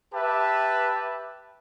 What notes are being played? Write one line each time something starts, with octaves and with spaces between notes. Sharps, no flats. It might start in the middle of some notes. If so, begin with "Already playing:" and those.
G4 B4 E5 A5